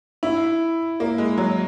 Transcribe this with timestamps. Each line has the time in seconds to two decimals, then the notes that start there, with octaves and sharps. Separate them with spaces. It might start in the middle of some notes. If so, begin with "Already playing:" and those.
0.23 E4
1.00 A#3
1.18 G#3
1.38 F#3